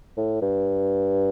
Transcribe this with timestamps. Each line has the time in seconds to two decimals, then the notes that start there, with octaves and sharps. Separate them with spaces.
0.17 A2
0.42 G2